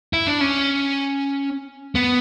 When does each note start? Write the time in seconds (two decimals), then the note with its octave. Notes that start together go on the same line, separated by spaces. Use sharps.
0.13 E4
0.27 D4
0.41 C#4
1.95 B3